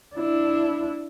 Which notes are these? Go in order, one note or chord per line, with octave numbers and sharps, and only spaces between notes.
D4 E4